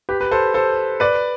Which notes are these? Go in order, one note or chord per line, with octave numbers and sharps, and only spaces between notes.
G4 B4
B4
A4 C5
A4 C5
B4 D5